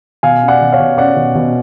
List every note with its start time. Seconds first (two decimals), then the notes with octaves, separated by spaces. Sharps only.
0.23 B2 F5 G#5
0.42 C#4
0.48 D5 F#5
0.61 B2
0.72 C#5 F5
0.79 B2
0.98 C#4 D5 F#5
1.16 B2
1.35 B2